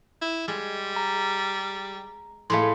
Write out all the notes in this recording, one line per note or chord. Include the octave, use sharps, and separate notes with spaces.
E4
G3 G#3
A#5
A2 G#3 A3 F5 B5 C6